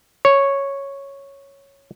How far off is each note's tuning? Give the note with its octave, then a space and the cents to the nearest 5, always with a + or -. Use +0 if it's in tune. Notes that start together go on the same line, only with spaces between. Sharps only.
C#5 -5